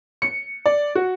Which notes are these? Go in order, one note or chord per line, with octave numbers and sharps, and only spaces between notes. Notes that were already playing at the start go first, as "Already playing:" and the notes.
C#7
D5
F#4